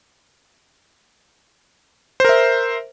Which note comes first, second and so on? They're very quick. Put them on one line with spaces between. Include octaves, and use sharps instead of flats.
C5 A#4 E5